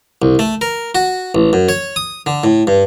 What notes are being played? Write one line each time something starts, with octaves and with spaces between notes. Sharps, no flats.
C2
A3
A#4
F#4
A1
F#2
C#5
D#6
D3
A2
G2